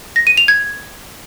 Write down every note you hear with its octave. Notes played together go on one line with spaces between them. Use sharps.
A#6
D#7
F7
G#6